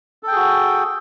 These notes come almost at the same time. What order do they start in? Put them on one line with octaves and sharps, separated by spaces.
A4 G5 G#4 F#4